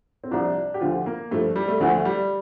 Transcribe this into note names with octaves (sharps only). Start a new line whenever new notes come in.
C4
C2 C3 F3 D4
G4
D2 D3 F3 F4
A#3
G2 F3 A3
G3
A3
D2 D3 F3 A3
G3